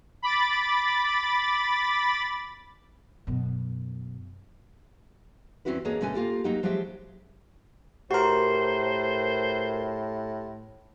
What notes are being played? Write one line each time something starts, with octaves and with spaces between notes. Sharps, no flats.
B5 D6 A6
F#2 B2
E2 C4 C#4 E4 F#4 B4
E2 A#3 D4 G#4 C#5 D#5
B2 D3 A3 C#4 B4 G#5
A#3 F4 G4 A4
F#3 A#3 D#4 F#4 G4
F3 F#3 G#3 G4 C5 E5
A2 F#4 G4 A#4 C5 C6